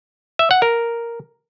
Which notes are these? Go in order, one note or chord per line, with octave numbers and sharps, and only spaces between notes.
E5
F#5
A#4